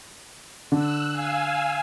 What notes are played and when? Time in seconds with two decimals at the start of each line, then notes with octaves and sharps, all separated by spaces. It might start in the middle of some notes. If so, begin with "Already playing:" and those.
0.72 D3 E6 F#6
1.11 F5 G#5 E6